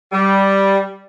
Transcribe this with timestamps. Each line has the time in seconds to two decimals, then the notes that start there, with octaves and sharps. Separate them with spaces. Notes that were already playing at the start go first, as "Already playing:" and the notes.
0.12 G3